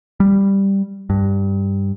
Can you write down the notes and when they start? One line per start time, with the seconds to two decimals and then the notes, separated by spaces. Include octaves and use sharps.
0.20 G3
1.10 G2